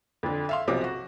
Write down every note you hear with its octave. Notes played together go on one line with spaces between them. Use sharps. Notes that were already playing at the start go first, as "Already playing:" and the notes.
F2 D3
E5 F5 C6
B1 C3 F3 D6
F#4